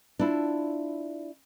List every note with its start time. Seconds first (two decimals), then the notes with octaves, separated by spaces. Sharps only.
0.19 D4 E4 F4